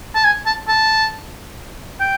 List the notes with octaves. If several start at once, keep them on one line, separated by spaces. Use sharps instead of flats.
A5
G#5
A5
A5
G5